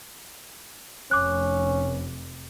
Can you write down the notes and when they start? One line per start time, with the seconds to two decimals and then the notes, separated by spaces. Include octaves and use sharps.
1.11 F1 C#4 D6 F#6